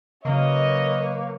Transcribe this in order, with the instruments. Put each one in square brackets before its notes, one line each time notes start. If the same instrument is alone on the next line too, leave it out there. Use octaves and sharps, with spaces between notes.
[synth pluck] C#3 F#3 [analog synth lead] A#3 [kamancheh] B4 C#5 [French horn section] D#5